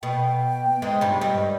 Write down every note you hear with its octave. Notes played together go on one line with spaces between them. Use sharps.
B2 B3 G5
G#2 G#3
G2 G3
G2 G3 D#5